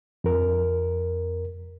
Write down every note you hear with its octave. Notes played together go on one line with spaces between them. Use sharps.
F2 A#4